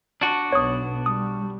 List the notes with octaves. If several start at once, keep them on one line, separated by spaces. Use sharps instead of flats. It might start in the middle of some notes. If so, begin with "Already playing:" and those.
D4 F#4
B1 B3 C#5 D#6
G3 D#6